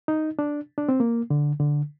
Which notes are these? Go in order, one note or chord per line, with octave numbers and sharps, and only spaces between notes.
D#4
D4
D4
C4
A#3
D3
D3